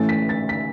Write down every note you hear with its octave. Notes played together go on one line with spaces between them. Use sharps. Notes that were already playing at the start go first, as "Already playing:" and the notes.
Already playing: A2 E3 A3 C#4 A6
B6
A6
B6